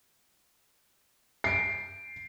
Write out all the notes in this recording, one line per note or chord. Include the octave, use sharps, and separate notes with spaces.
C7 D7